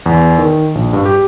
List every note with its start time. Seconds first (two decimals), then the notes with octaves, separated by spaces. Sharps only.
0.06 E2
0.38 D#3
0.75 A#1
0.93 G2
1.05 G4